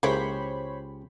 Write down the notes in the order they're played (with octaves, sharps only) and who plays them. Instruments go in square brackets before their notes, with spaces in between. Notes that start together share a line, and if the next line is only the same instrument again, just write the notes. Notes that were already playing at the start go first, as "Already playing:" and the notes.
[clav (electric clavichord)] C#2 G4 [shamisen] G#3 A#3 E4 [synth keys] C5 C#5 B5